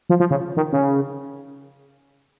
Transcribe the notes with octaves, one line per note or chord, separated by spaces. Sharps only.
F3
F3
C#3
D#3
C#3